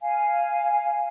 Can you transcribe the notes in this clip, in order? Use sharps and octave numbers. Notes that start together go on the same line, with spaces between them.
F5 G#5